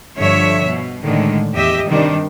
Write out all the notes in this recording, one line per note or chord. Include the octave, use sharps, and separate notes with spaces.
G2 D3 F3 C#5 E5
B2
A2 D3 D#3 G#3
E2 G4 D#5 E5
G2 C3 D#3 G3 D4